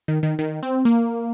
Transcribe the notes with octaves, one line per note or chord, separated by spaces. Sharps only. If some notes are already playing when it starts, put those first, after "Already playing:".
D#3
D#3
D#3
C4
A#3